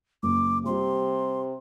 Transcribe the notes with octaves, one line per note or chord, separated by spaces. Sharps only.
F#1 D6
C3 G3 G4 C6